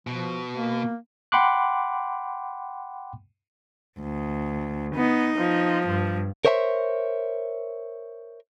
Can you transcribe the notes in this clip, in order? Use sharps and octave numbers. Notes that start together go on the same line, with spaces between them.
B2 F3
A#3
F#5 G5 B5 C6 D6 F#6
D2
B3 D#4
F3
G2
A#4 C5 C#5 E5 G#5 C6